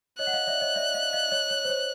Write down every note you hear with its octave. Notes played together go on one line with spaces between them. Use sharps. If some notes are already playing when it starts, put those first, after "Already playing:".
C#5 D#5 F#6
F#5
D#5 F5
D5 E5
C#5 D#5
D5 E5
D#5 F5
D#5 F5
C#5 D#5
C#5
C5
C#5